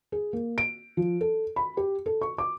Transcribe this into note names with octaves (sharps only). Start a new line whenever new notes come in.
G#4
A#3
D7
F3
A4
B5
G4
A4
C#6
D6